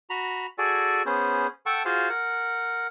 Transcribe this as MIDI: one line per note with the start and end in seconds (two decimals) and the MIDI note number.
0.10 0.47 66
0.10 0.47 82
0.10 0.47 83
0.58 1.02 66
0.58 1.02 68
0.58 1.02 69
0.58 1.02 74
0.58 1.02 80
1.06 1.47 59
1.06 1.47 61
1.06 1.47 68
1.06 1.47 72
1.66 1.83 69
1.66 1.83 78
1.66 1.83 79
1.66 1.83 81
1.66 1.83 85
1.66 1.83 88
1.85 2.09 65
1.85 2.09 66
1.85 2.09 68
1.85 2.09 72
1.85 2.09 77
2.09 2.87 70
2.09 2.87 78